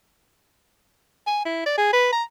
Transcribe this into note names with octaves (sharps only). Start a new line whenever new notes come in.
G#5
E4
D5
G#4
B4
A#5